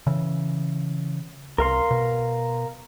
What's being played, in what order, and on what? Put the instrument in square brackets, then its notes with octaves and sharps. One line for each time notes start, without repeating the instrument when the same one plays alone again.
[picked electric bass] C#3 E3
[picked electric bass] C2 [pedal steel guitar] A#4 F5 C6
[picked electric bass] B2